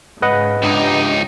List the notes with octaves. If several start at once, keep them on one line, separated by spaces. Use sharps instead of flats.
G#2 C#3 B4 D#5 F#5
C#2 D4 D#4 G4